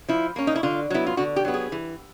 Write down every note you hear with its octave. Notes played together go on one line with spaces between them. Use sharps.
F3 E4
A#3 C#4
D#4
E4
D3 F4
F#3 B3 E4
F4
D3 F#4
G4
F#3 B3
G#4
E3